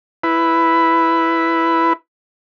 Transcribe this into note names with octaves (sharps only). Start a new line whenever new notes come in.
E4 B4